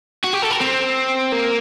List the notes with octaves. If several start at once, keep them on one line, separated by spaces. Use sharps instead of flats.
F#4
G4
A4
A#4
C4
A#3